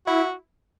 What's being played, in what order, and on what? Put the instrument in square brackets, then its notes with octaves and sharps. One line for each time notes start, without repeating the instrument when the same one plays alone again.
[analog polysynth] E4 [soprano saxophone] F#4